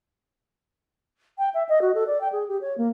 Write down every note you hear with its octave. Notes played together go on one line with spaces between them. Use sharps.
G5
E5
D#5
F#4
A4
D5
G5
G#4
G4
C#5
A#3